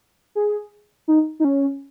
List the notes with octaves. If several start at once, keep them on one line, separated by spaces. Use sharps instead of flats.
G#4
D#4
D#4
C#4